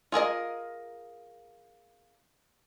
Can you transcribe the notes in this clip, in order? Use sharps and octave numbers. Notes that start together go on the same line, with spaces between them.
F4 G#4 A#4 D#5